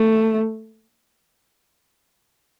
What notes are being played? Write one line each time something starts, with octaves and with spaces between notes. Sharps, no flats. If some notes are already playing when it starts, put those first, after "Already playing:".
Already playing: A3